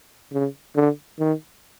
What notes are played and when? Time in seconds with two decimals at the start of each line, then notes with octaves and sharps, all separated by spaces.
0.33 C#3
0.76 D3
1.19 D#3